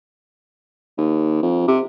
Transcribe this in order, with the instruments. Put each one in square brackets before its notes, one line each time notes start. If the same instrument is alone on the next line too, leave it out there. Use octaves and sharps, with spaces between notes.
[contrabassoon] D#2
F2
C3